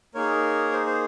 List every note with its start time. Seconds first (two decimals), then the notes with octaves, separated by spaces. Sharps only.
0.15 A#3 D#4 G#4 A#4 C#5
0.72 C5
0.86 C5